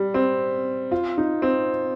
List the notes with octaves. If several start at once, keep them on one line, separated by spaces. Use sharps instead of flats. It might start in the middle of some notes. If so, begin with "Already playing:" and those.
Already playing: G3
C4
F4
D#4
C4